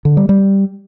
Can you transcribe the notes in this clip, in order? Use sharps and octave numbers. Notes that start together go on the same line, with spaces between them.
D3
G3
G3